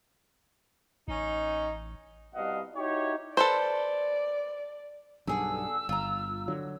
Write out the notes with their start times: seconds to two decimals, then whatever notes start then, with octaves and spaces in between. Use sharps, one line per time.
1.08 A1 C#4 D#4
2.34 C2 B2 G3 D#5 F5 F#5
2.76 D#4 E4 F#4 G4 C#5
3.37 A4 B4 C5 D5
5.27 B1 G2 D3 G#4 F#5 E6
5.89 G1 F4 A#5
6.48 D3 F#3